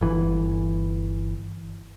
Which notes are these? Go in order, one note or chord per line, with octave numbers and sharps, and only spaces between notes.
G1 E3